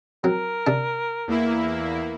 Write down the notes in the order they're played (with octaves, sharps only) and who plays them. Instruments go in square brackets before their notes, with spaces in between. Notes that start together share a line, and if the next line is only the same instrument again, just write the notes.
[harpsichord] F#3 C4 [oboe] A#4
[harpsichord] C3 D4 A5
[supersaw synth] E2 A#3 E4